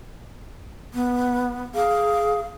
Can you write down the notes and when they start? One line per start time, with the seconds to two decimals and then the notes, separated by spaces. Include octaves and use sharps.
0.94 B3
1.75 G#4 F5